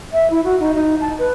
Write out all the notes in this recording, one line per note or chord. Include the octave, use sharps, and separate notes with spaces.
E5
E4
F#4
D#4
D#4
A5
B4